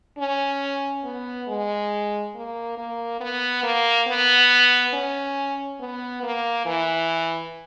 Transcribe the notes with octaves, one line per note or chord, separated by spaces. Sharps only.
C#4
B3
G#3
A#3
A#3
B3
A#3
B3
C#4
B3
A#3
E3